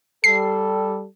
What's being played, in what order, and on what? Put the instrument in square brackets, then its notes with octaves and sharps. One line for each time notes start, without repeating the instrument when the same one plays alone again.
[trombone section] G3 A4 [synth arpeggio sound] C7